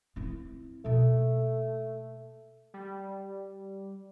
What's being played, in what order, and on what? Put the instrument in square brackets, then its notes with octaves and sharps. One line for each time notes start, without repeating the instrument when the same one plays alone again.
[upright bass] C4 E4
[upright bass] B2 A#3 [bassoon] A3
[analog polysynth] G3